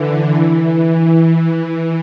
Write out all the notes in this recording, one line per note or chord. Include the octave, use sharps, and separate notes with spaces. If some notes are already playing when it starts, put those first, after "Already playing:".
Already playing: D3 E3
E3